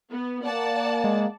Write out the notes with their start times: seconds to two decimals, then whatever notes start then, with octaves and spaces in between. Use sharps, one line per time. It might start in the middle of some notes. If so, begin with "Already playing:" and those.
0.11 B3
0.44 A#3 D5 F#5 A5
1.04 G#3